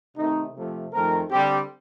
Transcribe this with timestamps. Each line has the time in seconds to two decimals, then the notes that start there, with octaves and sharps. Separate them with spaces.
0.16 C3 D#3 A3 C4 D#4
0.54 C3 F3 A3
0.92 F2 D#3 A3 C4 A#4
1.30 D3 G3 C4 G4